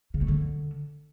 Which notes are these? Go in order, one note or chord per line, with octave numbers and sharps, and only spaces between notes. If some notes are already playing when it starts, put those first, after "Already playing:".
C#3
A3
D3